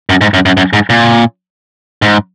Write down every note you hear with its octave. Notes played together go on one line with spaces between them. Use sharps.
F#2
G#2
F#2
F#2
F#2
G#2
A#2
G#2